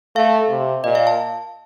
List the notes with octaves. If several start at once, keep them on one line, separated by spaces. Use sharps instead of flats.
A3 F5
C3
A#2 D#5
F5
A5